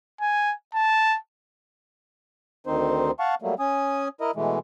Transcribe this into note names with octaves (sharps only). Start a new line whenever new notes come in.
G#5
A5
D2 D#3 C4 D#4 C5
F5 F#5 A5 C#6
F#3 G3 A3 A#3
C#4 G#5 D#6
E4 A#4 D#5
B2 E3 G#3 A3